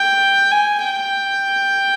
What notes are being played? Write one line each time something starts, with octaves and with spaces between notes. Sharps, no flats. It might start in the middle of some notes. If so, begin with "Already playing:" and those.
Already playing: G5
G#5
G5